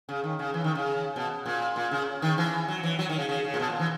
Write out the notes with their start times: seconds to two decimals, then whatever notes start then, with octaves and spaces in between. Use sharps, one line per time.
0.09 C#3
0.23 D#3
0.39 C#3
0.54 E3
0.64 D#3
0.75 C#3
1.16 B2
1.46 A#2
1.76 A#2
1.91 C#3
2.22 D#3
2.38 E3
2.68 F#3
2.83 E3
2.99 F#3
3.09 D#3
3.18 C#3
3.29 C#3
3.44 C#3
3.54 A#2
3.59 B2
3.70 A#2
3.80 E3